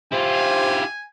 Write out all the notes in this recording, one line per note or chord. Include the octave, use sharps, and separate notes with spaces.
E4 F4 G4 C5 G#5